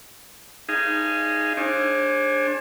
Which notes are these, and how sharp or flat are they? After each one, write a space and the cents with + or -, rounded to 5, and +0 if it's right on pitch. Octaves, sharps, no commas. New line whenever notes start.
D#4 +0 G#4 +0 F5 -30
D4 +0 G#4 +0 C5 +45